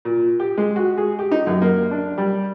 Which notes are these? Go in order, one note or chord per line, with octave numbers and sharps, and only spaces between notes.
A#2
G4
G#3
F#4
G#4
G4
D#4
F#2
A#3
D4
G3